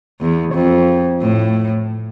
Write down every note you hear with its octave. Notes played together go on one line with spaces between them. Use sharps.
E2
F2
A2